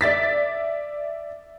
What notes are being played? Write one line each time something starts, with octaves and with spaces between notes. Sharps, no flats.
D5 E5 A6 B6